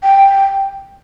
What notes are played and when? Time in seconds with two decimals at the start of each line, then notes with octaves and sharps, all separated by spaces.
0.03 G5